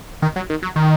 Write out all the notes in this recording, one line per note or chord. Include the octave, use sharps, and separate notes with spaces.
D#3
F#3
D#3
F#3
D#3